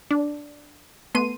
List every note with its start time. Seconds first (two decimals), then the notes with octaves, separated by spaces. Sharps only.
0.11 D4
1.15 A3 B3 C6 D#7